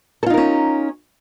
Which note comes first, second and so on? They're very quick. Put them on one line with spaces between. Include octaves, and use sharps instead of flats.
A4 F4 D#4 A#4 C#4